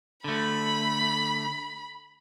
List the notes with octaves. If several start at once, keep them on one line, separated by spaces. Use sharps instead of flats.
D3 A3 B5